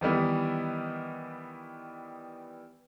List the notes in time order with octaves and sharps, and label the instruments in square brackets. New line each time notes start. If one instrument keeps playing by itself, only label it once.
[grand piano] D#3 E3 G3 B3